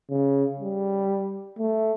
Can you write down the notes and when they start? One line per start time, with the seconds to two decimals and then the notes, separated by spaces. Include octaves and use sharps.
0.10 C#3
0.60 G3
1.59 A3